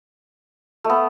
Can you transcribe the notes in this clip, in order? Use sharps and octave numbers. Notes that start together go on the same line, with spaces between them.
A3
B3